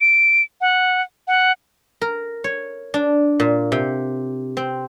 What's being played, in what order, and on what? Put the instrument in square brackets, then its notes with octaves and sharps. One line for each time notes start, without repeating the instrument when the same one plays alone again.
[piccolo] D7
F#5
F#5
[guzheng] A#4
C#5
D4
A#2
C3
C4